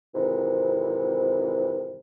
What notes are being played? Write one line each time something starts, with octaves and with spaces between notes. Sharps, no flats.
F2 G#2 C3 D#3 E3